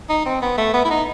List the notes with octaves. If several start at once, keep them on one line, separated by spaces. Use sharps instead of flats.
D#4
C4
B3
A3
B3
E4
D#4